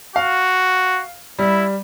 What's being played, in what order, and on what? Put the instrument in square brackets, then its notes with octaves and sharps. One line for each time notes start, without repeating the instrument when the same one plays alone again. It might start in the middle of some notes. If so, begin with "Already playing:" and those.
[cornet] F#4 [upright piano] F5
[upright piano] G3 [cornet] E4